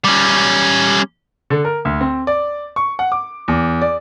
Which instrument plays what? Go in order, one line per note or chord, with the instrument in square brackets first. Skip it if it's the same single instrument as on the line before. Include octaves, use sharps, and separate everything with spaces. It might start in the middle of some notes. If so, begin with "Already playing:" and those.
[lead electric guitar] G3 C#4
[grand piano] D3
A#4
D2
C4
D5
C#6
F#5
D6
E2
D5